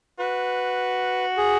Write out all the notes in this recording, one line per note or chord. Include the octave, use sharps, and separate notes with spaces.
F#4 B4
G#4